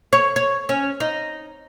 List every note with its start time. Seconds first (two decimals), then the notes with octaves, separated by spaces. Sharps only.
0.13 C#5
0.36 C#5
0.69 C#4
1.00 D#4